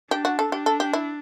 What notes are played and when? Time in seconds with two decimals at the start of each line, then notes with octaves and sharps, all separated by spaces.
0.11 D4 G4
0.25 F#4
0.39 A4
0.52 D4 G4
0.66 A4
0.80 G4
0.93 E4